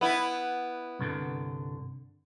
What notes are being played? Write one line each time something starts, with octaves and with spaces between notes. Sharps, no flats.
B3 E4
C2 G2 D3